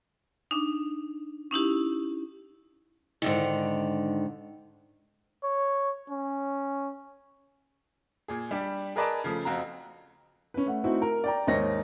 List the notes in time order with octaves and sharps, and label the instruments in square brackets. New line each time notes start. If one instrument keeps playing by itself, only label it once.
[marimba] D4 D#4
C#4 D#4 E4 G4
[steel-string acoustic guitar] G#2 D3 D#3
[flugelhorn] C#5
C#4
[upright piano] A#2 G#4
G3 D4 G4
G#4 A#4 B4 D5 D#5 A5
C#3 F3 A3
F2 C4 F#4 F5 A#5
C#4 B4
A3 F#5
A3 C4 D#4 E4 F#4
A#4
D5 G5 A#5
D#2 G#2 D#4 C5 C#5 A#6